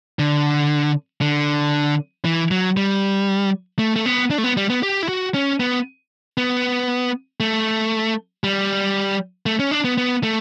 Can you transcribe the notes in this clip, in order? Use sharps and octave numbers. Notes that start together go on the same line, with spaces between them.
D3
D3
E3
F#3
G3
A3
A3
B3
D4
A3
B3
G3
B3
G4
E4
F#4
C#4
B3
B3
A3
G3
A3
C#4
D4
B3
B3
A3